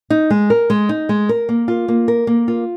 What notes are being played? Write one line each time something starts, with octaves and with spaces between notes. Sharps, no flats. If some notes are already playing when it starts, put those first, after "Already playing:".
D#4
G#3
A#4
G#3
D#4
G#3
A#4
A#3
F4
A#3
A#4
A#3
F4